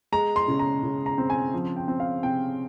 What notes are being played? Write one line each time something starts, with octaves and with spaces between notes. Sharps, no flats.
G#3 A#5
C6
C#3
A#5
C#3
A#5
C4
G#5
F3
G5
C4
F5
C3 G5